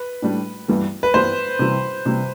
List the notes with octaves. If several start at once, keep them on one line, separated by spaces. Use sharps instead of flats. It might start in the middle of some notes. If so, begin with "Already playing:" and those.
Already playing: B4
A2 G3 D4
G2 E3 G3 B3
B4
G2 E3 G3 B3 C5
C3 E3 G3
C3 E3 G3